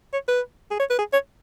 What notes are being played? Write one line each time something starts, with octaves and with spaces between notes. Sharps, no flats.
C#5
B4
G#4
C#5
B4
G#4
C#5